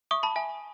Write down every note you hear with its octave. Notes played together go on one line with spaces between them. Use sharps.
E5 C#6 D#6
A5 B5
E5 G#5